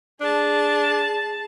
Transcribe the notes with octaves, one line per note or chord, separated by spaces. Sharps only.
D4 G#4 A5